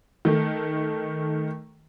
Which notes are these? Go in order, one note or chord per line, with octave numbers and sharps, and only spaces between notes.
D#3 A3